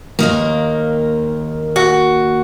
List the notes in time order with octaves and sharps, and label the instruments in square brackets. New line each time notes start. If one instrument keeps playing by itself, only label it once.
[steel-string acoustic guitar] D#2 D#3 A#3
[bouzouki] F#4